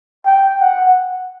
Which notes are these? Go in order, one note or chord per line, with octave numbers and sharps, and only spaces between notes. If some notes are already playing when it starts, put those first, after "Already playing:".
G5
F#5